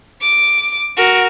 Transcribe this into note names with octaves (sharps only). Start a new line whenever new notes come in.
D6
F#4 A#4